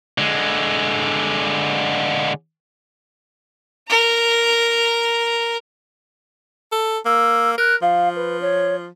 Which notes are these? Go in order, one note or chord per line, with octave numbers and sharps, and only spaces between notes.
D3 G#3
A#4 A#5
A4
A#3 E6
A#4 F#6
F3 F5
B4
C#5